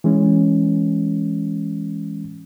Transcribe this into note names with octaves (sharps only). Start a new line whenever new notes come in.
E3 G#3 C#4